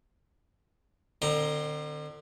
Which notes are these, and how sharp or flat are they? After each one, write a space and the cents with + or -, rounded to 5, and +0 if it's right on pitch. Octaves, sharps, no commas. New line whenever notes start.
D3 +40 C4 +0 A#5 +20